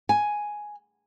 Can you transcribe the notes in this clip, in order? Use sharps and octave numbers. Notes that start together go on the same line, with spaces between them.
G#5